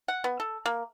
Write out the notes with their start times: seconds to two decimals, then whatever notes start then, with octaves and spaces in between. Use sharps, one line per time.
0.08 F#5
0.24 B3
0.40 A4
0.66 A#3